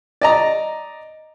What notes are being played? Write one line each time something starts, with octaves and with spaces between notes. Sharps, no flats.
D5 D#5 A#5